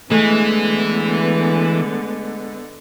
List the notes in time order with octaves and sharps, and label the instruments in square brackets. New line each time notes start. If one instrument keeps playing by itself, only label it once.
[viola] D3 B3 [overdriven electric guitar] E3 [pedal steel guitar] G#3 [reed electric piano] A3